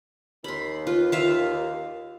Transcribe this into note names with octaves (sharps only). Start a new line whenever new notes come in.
D#2 B5 C6
F4 B4
F4 E5 F5